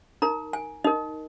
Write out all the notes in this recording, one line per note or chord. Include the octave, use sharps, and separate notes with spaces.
D#4 A#4 A#5
G#5
D#4 A#4 D#5